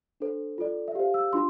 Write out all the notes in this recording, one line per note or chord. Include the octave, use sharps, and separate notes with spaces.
D4 A4 C5
F4 A4 D5
E5
G4 C5 F5
E6
D4 F4 C6